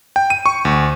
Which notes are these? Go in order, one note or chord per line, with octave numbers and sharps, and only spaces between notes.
G5
D#7
C#6
D2